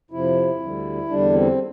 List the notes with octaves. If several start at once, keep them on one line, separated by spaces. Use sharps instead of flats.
F2 C3 F3 E4
D2 D3 G3
E2 D3 G3 D4
C4